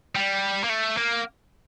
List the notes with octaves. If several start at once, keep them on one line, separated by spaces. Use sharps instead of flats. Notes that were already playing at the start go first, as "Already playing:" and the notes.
G3
A#3
A3
A#3